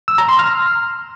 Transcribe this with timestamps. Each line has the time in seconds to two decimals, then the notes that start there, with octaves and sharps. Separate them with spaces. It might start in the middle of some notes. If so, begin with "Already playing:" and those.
0.08 E6
0.18 A#5
0.29 C6
0.39 F6